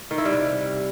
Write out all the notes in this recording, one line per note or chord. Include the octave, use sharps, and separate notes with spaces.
D#3
E4
G3
C3